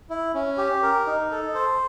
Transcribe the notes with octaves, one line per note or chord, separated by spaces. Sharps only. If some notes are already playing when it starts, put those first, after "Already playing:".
E4
C#4
G4
A#4
D#4
A4
C5